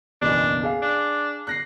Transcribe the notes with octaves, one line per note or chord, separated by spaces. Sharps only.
F#1 B1 E2 D4
G#4 F5
D4
F#6 A#6 C7